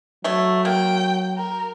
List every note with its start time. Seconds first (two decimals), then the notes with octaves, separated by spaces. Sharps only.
0.24 F#3 A3 C#5
0.65 A#3 G5
1.38 A#4